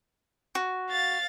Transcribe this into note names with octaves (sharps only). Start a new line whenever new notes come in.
F#4
F5 A6